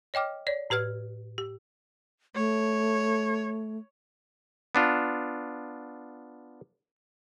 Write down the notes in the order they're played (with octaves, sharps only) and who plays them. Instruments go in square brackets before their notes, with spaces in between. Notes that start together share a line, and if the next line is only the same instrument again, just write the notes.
[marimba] C#5 D#5 G5 D6 F6
C#5 D5
A2 G4 B4 F6 G#6
G4
[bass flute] A3 [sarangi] C#5
[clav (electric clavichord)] B3 D4 F4